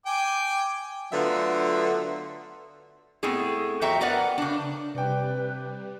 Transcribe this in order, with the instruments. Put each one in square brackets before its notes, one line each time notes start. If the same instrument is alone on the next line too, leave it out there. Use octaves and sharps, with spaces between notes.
[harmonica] G5 G#5 D6
[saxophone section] D3 F#3 A3 B3 F4 E5
[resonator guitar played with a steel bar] A2 B3 C4 G#4
F2 C4 F#4 E5 G5 A#5
B3 A#4 B4 D5 F#5
C#3 D4
[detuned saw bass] C3 [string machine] G3 [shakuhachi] B4 [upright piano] D5 G5